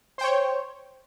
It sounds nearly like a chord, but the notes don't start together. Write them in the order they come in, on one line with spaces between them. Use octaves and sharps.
C5 G5 C#5